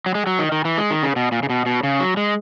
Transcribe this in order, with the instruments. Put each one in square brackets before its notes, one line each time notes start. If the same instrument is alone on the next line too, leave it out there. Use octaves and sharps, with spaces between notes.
[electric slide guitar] F#3
G#3
F#3
D#3
D#3
E3
G#3
D#3
C#3
B2
A#2
C#3
B2
B2
C#3
F#3
G#3